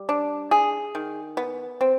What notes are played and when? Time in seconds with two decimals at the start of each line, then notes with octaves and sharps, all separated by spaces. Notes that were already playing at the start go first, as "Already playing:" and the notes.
Already playing: G3
0.09 D4
0.51 G#4
0.95 D#3
1.37 B3
1.81 C4